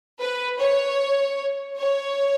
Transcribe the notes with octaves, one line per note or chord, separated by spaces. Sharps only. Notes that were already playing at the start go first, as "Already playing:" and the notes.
B4
C#5
C#5